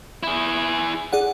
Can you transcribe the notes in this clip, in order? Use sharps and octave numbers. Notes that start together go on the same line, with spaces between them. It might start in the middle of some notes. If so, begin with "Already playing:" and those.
E4 G#4
G#4 D5 F#5